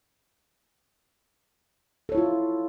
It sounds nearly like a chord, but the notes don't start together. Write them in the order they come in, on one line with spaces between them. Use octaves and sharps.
A4 C#5 E4 F4